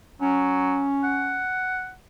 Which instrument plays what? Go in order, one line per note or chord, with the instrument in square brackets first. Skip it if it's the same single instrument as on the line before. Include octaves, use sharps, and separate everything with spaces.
[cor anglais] F#3 [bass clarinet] C#4
[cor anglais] F#5